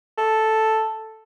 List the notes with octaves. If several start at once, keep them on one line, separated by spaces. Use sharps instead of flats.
A4